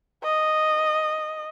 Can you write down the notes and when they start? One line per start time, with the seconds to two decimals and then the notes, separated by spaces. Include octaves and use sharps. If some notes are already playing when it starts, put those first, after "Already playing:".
0.24 D#5